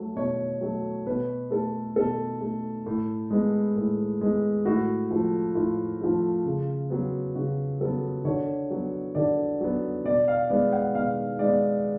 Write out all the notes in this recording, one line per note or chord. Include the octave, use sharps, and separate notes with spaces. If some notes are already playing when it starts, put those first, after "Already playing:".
Already playing: F#3 A3
B2 C#5
F#3 A3
B2 B4
A3 A4
B2 A4
A3
A2
G#3 B3
A2
G#3 B3
A2 F#4
F3 A3
A2 F4
F3 A3
C#3
F#3 B3
C#3 F#4
F#3 B3 A4
D3 C#5
F#3 B3
D3 D5
F#3 B3
B2 D5
F5
G#3 B3 D5
F#5
B2 F5
G#3 B3 D5